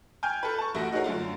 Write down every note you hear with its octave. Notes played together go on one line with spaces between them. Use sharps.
G5 G#5 F6 G6
A4 B4
A5 C#6
A1 A3 F#4 A#6
D#4 F#4 G#4 A#4 C#5
F#2 D3 A3 F4